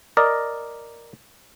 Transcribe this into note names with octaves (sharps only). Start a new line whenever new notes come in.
A#4 D5 D#5